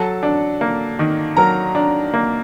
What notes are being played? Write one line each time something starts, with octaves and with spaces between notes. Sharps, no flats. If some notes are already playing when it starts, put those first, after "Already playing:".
Already playing: F#3 A4 A5
D4
A#3
D#3
F#3 A#4 A#5
D4
A#3